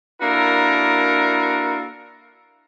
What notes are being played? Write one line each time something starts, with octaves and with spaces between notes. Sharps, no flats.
A#3 D4 E4 F#4 A4 A#4